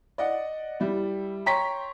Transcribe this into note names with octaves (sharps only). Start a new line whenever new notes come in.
D5 D#5 F#5
G3 E4
C#5 G5 A#5 C6 C#6 B6